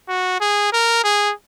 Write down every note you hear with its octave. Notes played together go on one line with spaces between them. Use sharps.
F#4
G#4
A#4
G#4